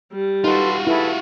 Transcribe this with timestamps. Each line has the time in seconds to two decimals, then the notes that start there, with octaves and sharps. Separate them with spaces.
0.12 G3
0.44 D#4 F4 F#4 A4 B4 C6
0.87 E4 G#4 A4 B4